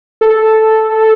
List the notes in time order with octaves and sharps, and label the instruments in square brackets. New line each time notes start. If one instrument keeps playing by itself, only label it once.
[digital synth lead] A4